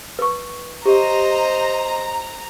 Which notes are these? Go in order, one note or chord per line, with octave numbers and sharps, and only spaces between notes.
B4 C#6
G4 C5 D#5 A#5